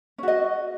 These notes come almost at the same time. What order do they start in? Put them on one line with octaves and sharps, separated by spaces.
C#4 F#4 D#5